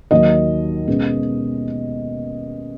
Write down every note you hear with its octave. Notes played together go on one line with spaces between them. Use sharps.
D#2 D#3 F#3 D#5
B2 G#3 C#4